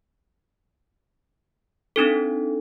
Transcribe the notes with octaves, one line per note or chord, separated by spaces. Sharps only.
C4 D4 D#4 A4